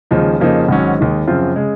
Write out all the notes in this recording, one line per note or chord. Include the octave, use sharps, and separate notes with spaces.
D#2 C#3 F3 G#3 D#4
F2 C#3 F3 A#3 D#4
G#1 G#2 F#3 C#4
D#2 D#3 G#3
F#2 C#3 F3 C4 F4
C#3 G#3